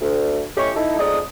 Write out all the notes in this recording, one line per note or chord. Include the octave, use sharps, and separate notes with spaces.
D2
A2 A3 C#4 G4 D#5 C#6
D#4 E4 A4
F2 G#3 D#4 D5 D#6